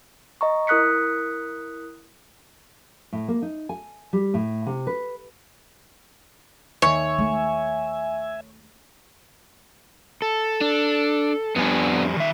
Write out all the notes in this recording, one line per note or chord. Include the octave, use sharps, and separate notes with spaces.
D#5 A#5 C#6
E4 A#4 D#6 F#6 B6 C#7
A2
A#3
D#4
G#5
G3
A2
C3
B4
D#2 D#3 C#5 E5 G#5
A3
A4
D4
F2 G3 B3 D4 G#5
D#3 E5